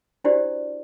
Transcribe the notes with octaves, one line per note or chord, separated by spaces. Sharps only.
D4 E4 F#4 G4 C5 D5